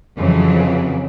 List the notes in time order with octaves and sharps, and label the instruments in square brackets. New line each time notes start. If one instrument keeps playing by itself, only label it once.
[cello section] F2 C#3 E3 F#3